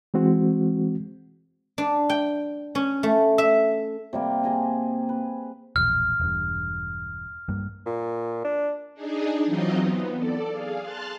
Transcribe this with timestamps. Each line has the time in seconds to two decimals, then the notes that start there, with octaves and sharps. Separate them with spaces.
0.14 E3 G#3 C4 F#4
1.78 D4
2.09 G5
2.75 C#4
3.03 A3
3.38 E5
4.13 C3 G3 A#3
4.43 G#4 A#5 C6
5.09 B4
5.76 E1 A#1 F6
6.20 E1 G2
7.49 G2 G3 A#3
7.86 A#2
8.44 D4
8.94 D4 D#4 G#4
9.46 E3 F#3 C4 D#4 F4 D#5
9.81 B3
10.15 A4 D5
10.48 G#4 F5
10.80 A5 C6 F6 F#6 A6